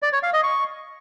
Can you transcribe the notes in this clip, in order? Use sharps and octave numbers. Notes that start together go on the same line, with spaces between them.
D5
C#5
F5
D#5
C#6